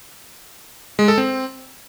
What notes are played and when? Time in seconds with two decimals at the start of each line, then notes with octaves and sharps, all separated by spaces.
0.99 G#3
1.08 A4
1.18 C4